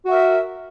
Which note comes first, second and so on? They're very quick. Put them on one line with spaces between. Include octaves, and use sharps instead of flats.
F#4 E5 A#4